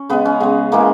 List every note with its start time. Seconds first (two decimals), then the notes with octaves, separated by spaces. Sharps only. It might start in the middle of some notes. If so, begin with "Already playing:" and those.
Already playing: C#4
0.09 C#3 G#3 B3
0.25 C#4
0.40 C#3 G#3 B3
0.72 C#3 E3 G#3 A#3